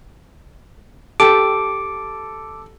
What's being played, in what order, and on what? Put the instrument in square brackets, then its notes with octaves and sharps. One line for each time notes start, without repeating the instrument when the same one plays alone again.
[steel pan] G4 A5 [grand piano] A4 [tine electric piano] D6